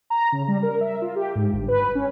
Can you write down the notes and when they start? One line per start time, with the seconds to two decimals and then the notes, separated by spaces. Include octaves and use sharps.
0.10 A#5
0.32 C#3
0.48 G3
0.63 A#4
0.81 E5
1.02 F4
1.16 G4
1.35 G#2
1.53 G1
1.68 B4
1.95 C#4